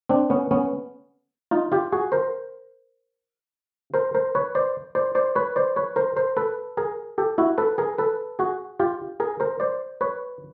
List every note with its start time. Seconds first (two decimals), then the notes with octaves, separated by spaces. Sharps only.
0.09 C4 D4
0.30 B3 C#4
0.51 B3 C#4
1.51 D#4 F4
1.72 F4 G4
1.92 F#4 G#4
2.12 A#4 C5
3.94 A#4 C5
4.15 A#4 C5
4.35 B4 C#5
4.55 C5 D5
4.95 C5 D5
5.15 C5 D5
5.35 B4 C#5
5.56 C5 D5
5.76 B4 C#5
5.96 A#4 C5
6.16 A#4 C5
6.37 A4 B4
6.77 G#4 A#4
7.18 G4 A4
7.38 E4 F#4
7.58 A4 B4
7.78 G#4 A#4
7.98 A4 B4
8.39 F#4 G#4
8.80 F4 G4
9.20 G#4 A#4
9.40 A#4 C5
9.60 C5 D5
10.01 B4 C#5